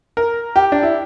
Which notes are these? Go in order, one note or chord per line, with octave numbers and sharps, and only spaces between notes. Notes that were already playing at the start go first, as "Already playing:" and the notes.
A#4
G4
D4
E4